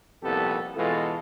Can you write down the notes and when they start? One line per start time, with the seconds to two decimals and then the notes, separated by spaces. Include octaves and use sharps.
0.23 C2 F2 A#2 B3 G4 A4
0.75 B2 E3 G#3 F4 A4